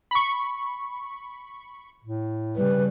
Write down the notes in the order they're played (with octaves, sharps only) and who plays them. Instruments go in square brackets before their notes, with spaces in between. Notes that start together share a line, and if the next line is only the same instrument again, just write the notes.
[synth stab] B5 C#6
[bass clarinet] A2
[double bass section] C#3 G3 [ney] B4